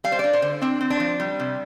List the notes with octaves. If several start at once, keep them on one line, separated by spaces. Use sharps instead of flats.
G3 F5
C5
D4 D5
C5
D3
C4 D4
C4
D4
F3
G3
C3